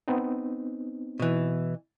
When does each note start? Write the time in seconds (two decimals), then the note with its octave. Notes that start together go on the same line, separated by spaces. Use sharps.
0.08 B3 C4 D#4
1.20 B2 E3